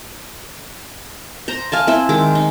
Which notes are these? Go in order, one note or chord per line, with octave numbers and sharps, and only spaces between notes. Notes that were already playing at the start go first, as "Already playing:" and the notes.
C5 A#5
F5 G#5 A5
C4 E4 C5
D#3 G#3 D6
D#4